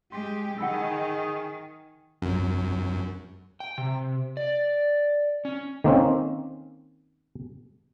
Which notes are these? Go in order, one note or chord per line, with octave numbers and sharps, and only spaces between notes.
G#3 G4 C6
D#3 G#4 F#5 B5 E6
F#2
G5
C3
D5
C#4
D#3 A#3 C4 C#4